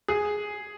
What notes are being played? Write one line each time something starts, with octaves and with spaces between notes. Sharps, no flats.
G#4